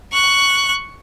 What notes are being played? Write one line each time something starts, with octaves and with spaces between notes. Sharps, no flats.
C#6 F#6